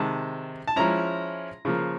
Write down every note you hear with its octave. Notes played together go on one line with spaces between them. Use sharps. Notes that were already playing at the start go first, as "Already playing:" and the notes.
Already playing: C3 D#3 G#3 A5
A5
F3 G#3 C#4 E4 A#5
C#3 F3 A#3